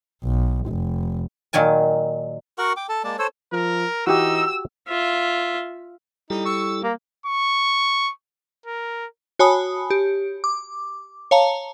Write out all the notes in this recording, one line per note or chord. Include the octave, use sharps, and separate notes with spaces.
B1
F1
A#2 D#3 F#3 G#5 A5
F#4 A#4 F#5 C#6
G5 D6
A4 A5
G#3 A#3 D5 A5
A4 C5 C#5 E6
F3 A#4
E3 D#4 F#4 G4 E6
F4 E5
G3 D#4 E4 A4
C#6 E6
A#3
C#6
A#4
F#4 C#5 G#5 A5 B5 D#6
G4
D6
C#5 F5 A5 A#5